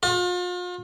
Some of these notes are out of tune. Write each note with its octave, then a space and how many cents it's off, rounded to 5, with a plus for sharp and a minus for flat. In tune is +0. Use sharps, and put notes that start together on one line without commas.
F4 +40